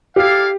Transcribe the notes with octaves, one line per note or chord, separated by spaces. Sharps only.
E4 G4 A4 D5 F5